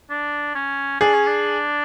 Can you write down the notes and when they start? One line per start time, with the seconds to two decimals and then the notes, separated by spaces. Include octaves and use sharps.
0.10 D4
0.55 C#4
1.00 D4 G#4
1.14 C#4
1.27 D4